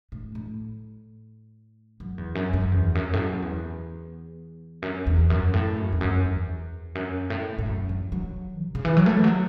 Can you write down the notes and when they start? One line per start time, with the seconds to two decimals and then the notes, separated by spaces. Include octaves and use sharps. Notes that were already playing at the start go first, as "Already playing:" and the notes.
0.12 A2
0.35 A2
2.00 F#2
2.18 E2
2.35 F#2
2.53 F#2
2.72 E2
2.95 F#2
3.13 A2
3.18 F#2
3.42 E2
4.82 F#2
5.07 E2
5.30 F#2
5.54 A2
5.76 F#2
5.93 E2
6.01 F#2
6.24 E2
6.95 F#2
7.30 A2
7.59 A2
7.66 F#2
7.89 F#3
8.12 F#3
8.64 B2
8.75 C#3
8.85 E3
8.97 F#3
9.06 A3
9.17 E3
9.24 F#3